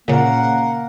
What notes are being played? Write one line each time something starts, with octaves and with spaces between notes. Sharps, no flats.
A#2 C#3 A#3 F#5